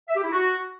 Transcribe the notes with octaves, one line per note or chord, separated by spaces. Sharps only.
E5
G4
E4
F#4